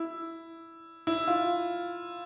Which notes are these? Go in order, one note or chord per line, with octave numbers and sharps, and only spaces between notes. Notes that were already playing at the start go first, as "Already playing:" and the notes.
Already playing: E4
E4
F4